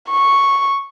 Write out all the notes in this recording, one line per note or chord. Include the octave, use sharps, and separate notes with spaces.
C#6